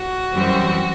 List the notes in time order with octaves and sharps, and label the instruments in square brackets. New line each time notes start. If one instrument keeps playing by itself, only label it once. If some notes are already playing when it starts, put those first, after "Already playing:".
Already playing: [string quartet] F#4
F#2 E3 G3 C4